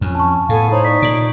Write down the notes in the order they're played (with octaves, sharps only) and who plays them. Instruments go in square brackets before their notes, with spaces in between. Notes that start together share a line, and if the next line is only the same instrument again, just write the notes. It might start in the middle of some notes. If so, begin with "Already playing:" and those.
[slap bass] F2 [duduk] C#4
[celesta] A5 C#6
[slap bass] A2 [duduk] B3 [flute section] A4 F5 G#5
[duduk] D#4 [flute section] C5 C#5 B5
[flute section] D5 C#6 [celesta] B6
[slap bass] A#2 [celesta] D7 F#7